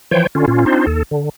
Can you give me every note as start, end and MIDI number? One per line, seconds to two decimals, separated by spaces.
0.11 0.27 52
0.11 0.27 53
0.11 0.27 72
0.11 0.27 73
0.11 0.27 79
0.35 0.46 50
0.35 0.46 61
0.35 0.46 65
0.48 0.65 46
0.48 0.65 61
0.48 0.65 65
0.66 0.86 60
0.66 0.86 62
0.66 0.86 63
0.66 0.86 65
0.66 0.86 72
0.87 1.03 39
0.87 1.03 69
1.11 1.29 50